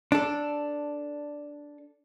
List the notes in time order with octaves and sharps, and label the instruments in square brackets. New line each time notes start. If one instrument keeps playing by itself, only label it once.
[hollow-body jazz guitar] D4 A4